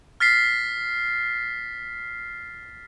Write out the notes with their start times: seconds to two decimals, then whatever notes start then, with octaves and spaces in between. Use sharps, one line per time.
0.20 F6 A6 B6 C7